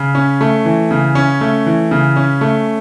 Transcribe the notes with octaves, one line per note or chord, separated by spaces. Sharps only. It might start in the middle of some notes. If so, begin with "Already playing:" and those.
Already playing: C#3
C#4
A3
E3
C#3
C#4
A3
E3
C#3
C#4
A3